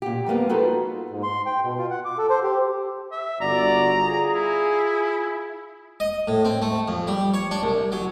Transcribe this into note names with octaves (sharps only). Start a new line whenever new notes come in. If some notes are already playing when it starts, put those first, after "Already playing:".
A#2 G4
F2 G3 A#3 B3
D#4 F4 F#4 G#4 A4 B4
G#2
C6
G5
B2
F4
F#5
D6
A4
C5
G4
E5
G1 F#4 D5 A#5
F4 G#4
E4
D#5
A2
C4
A3
F2
G3
C#5
D4
C2
F#3